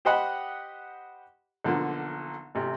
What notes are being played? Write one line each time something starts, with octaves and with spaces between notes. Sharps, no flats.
G4 C5 D#5 F#5 B5
B1 D3 F3 A#3
A1 C3